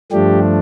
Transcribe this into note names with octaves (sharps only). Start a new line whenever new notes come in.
G2 F3 A3 D4 G4